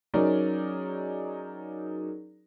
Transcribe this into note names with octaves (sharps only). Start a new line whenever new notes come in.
F#3 C#4 D#4 G#4 A#4 D5